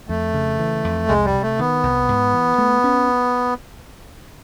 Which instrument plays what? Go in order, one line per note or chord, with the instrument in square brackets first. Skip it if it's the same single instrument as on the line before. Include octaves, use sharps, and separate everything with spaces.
[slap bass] F2 [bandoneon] A3
[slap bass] C#3
E3
F2
[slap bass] C2 [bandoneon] G#3
[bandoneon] G3
[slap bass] C3
[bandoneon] A3
[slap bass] D#3 [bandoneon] B3
[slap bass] C2
G#2
E3
A3
C#4